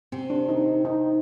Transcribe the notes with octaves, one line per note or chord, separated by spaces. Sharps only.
C3 C4
D4
D#4
D#4
D#4